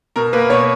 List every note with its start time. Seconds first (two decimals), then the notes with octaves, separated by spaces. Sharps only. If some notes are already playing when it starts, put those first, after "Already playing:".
0.16 B2 A#4
0.33 A#3 B4
0.50 B2 C#5